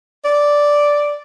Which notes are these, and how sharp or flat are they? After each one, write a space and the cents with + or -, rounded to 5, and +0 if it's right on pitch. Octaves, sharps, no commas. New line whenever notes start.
D5 -5